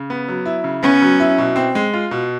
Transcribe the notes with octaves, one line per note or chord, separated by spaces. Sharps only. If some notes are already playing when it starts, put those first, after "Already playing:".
Already playing: C#3
B3
F#3
E4
C#3
B3 C#4
F#3
E4
B2
C4
G#3
F4
B2